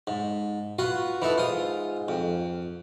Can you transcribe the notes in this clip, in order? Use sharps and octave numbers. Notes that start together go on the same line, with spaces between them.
G#2
F4 F#4 B4
E3 D#4 A4 B4
G#2 F4 D#6
F2